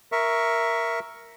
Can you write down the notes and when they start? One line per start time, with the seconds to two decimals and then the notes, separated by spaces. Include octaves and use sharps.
0.12 A#4 E5 C#6